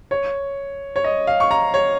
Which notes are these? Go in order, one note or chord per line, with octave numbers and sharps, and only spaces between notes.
C#5
C#5
D#5
F5
C#6
A#5
C#5